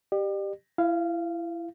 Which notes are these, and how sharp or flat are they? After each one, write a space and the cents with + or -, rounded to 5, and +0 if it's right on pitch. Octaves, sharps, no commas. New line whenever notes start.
G4 +0 D5 +40
E4 +25 F5 -15